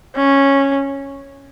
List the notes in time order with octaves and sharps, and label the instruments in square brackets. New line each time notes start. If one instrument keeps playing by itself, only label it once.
[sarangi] C#4